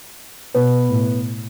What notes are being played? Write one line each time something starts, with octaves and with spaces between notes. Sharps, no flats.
B2 B3 B4
A2